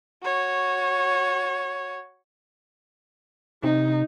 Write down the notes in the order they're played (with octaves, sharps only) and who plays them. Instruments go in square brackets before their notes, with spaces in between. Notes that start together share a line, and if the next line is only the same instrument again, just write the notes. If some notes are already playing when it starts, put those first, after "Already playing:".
[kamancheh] F#4 C#5
[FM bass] C3 [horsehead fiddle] D#4